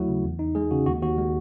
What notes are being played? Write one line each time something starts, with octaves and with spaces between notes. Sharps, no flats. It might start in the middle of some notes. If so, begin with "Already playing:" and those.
Already playing: D#2 F#3 A3 E4 F#4
C#3
E2
D#4
G#3 G#4
C#3 F#4
D#2 F#4
D#2 F#4
G#3